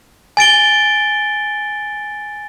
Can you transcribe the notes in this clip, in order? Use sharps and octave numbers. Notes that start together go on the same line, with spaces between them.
G#5 A6 D7 G7